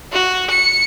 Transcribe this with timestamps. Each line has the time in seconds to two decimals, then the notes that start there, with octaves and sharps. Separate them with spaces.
0.12 F#4
0.50 C#7